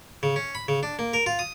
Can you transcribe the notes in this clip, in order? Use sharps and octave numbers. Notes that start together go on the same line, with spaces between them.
C#3
C#4
B5
C#3
D4
A#3
A#4
F4
D#6